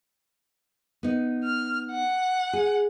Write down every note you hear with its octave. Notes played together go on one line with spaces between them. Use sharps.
B3 D#4
F6
F#5
G#4